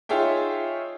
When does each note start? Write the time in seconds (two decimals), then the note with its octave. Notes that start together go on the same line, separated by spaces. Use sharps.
0.09 D#4 F4 G#4 C#5 E5 G5